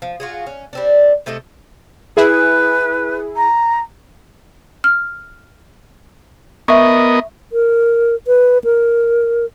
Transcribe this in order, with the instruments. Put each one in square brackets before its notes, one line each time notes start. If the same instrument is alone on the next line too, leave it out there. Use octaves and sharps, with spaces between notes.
[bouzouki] F3
F4 F#4 G#4
C#4
G3 C4 D4
C3 A3 A4 D#5
[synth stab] E4 G#4 [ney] B4
[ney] A#5
[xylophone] F6
[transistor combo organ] B3 A#4 D#5 [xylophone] E5 C#6
[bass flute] A#4
B4
A#4